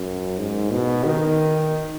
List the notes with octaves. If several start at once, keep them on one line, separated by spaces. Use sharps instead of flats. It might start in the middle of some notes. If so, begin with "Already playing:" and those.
Already playing: F#2
G#2
B2
D#3